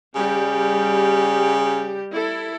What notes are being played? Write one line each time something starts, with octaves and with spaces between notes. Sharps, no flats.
C#3 G3 G4
E4 A4